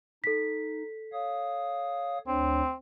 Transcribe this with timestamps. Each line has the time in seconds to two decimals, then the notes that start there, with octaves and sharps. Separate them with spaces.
0.24 D#4 A4 B6
1.13 C#5 F5 D#6
2.27 D2 C4 D4 C#5